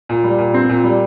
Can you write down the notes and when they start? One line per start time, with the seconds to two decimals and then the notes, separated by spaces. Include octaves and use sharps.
0.09 A#2
0.24 G3
0.39 A#2
0.54 C4
0.69 A#2
0.84 G3